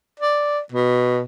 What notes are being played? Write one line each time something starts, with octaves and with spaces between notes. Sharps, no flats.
D5
B2